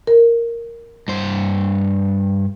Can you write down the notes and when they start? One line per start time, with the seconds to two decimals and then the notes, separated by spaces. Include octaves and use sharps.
0.07 A#4
1.08 G2 C5